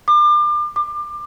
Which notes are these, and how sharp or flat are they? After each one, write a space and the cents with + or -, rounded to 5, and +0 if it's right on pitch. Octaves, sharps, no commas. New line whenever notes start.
D6 +35
D6 +30